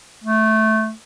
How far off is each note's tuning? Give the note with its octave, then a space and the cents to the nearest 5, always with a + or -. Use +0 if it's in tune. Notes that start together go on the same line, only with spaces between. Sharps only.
A3 -10